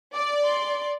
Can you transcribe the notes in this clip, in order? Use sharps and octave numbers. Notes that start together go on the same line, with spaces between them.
D5 D6
C6